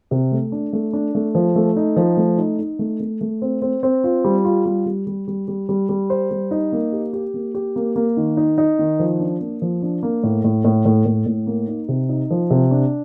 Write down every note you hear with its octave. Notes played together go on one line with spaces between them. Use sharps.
C3
A3
D4
A3
D4
A3
F3
A3
D#4
F3
A3
D#4
D#4
A3
A3
A3
C4
C4
C4
F4
G3
F4
G3
G3
G3
G3
G3
G3
G3
C5
G3
D#4
A#3
G4
G4
A#3
G4
A#3
A#3
D#3
D#4
D#4
D#3
F3
D4
A#3
F3
D4
A#3
A2
A2
A2
A2
A2
A2
A#3
D#4
C3
D#4
F3
C3
D4